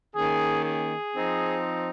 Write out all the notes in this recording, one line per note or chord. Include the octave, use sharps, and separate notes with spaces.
D#3 A#3 C#4 G#4
G#4
F3 C4 D#4